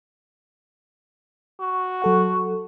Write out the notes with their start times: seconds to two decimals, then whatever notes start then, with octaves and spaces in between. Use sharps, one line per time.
1.60 F#4
2.02 F#3 A4 F#5